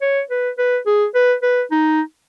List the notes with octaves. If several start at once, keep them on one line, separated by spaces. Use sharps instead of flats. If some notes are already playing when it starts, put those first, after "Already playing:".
C#5
B4
B4
G#4
B4
B4
D#4